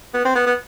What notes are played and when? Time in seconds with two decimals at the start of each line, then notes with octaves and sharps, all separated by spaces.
0.14 B3
0.25 C4
0.35 B3
0.46 B3